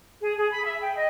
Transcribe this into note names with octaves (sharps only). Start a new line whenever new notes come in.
G#4
G#4
B5
E5
G5
D#5